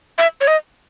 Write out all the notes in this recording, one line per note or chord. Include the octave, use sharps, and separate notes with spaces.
E5
C#5
D#5